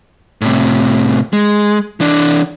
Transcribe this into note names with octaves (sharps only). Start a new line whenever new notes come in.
A2 C3
G#3
E3 D4